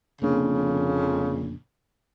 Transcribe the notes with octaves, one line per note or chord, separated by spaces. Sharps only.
F1 F2 A#2 C#3 A#3 D4